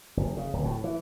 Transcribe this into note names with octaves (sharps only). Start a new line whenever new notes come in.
F#1
C#3
D1
A2
E3